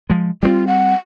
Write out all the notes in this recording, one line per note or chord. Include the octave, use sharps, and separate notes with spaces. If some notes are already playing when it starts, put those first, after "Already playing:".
F3 G#3
G3 A3 C4 F4
F#5